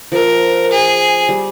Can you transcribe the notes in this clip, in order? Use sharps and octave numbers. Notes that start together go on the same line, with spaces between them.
F3 A#4
G#4
G3